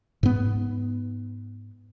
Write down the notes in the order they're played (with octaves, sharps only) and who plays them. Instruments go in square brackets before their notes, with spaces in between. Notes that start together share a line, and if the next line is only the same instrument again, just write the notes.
[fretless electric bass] G#2 B3